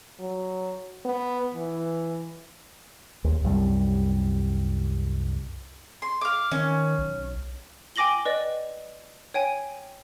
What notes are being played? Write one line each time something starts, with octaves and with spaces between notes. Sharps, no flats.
F#3
B3
E3
D#2
C2 F#2 G3
C6
F5 D6
D#3 C#4
B1
G5 G#5 D6 A#6 F#7 G7
B4 D5 D#5
C#5 G5 G#5